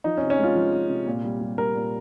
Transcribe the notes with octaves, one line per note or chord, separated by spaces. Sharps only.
F3 D#4
C#4
C3
C#4
G#3 F4
F3
G#3
C3
A#2
G3
G3
G3 A#4
A#2